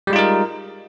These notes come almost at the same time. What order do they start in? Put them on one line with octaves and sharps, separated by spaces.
G3 G#3 F4 D#4 A#4